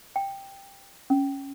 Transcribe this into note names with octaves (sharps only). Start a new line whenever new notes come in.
G5
C#4